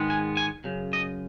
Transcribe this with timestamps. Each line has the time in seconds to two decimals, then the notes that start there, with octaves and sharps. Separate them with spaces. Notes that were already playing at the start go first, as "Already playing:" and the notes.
Already playing: G#2 D#3 G#3 B3
0.10 G#5
0.37 G#5
0.64 F#2 C#3
0.93 D#5